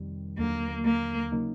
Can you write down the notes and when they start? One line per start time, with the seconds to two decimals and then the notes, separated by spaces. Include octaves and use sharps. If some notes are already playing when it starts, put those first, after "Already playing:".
Already playing: F2 C3 D#3 G3
0.38 D#2 D3 F#3 A#3
0.85 A#3
1.32 C#3 F#3 A#3 D#4